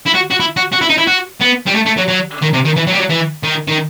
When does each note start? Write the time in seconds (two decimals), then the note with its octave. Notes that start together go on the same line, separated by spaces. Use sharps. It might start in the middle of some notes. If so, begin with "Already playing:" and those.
0.06 E4
0.14 F#4
0.30 F#4
0.40 E4
0.57 F#4
0.73 F#4
0.81 E4
0.90 D#4
0.98 E4
1.07 F#4
1.41 B3
1.67 G3
1.75 A3
1.86 A3
1.97 F#3
2.08 F#3
2.42 D#3
2.53 C3
2.65 D#3
2.76 E3
2.87 F#3
2.93 G3
2.98 F#3
3.09 E3
3.43 D#3
3.68 D#3